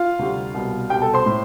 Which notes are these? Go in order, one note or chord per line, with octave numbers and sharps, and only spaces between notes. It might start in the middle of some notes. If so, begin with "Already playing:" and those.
Already playing: F4 F5
D2 C3 G3
C2 B2 G3
C2 B2 G3 G4 G5
A4 A5
C5 C6
A2